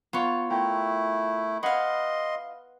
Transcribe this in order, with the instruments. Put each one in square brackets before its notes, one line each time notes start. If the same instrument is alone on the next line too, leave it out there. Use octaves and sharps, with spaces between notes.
[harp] B3 [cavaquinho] F4 C#5
[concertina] A3 E4 [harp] A#4 G5
[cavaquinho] E4 F5 [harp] B4 F#5 [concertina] D#5 C6